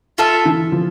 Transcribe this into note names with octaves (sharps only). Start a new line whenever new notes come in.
F4 A4 E5
E3
F3